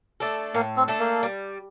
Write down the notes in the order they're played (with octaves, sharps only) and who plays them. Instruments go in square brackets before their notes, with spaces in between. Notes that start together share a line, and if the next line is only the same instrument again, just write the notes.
[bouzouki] A3 D4 A4
[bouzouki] A2 [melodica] A#3
[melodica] C4
[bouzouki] A3 D4 A4
[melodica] A#3
[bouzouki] G3